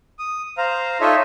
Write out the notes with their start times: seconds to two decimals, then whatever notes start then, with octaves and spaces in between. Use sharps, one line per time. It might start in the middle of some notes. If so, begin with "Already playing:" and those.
0.19 D#6
0.58 C5 F5 A#5
1.01 D#4 F4 A4 C#5 D#5 E5